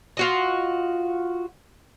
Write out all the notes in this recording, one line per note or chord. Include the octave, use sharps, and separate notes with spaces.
F4 F#4 D#5